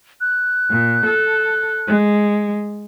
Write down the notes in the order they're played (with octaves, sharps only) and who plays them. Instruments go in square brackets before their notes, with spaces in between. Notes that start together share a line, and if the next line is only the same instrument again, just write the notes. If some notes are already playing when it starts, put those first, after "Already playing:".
[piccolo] F#6
[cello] A#2
A4
G#3